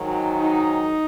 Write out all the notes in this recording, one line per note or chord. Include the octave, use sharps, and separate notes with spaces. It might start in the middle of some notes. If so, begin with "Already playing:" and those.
Already playing: G#2 D#3 F#3
D#4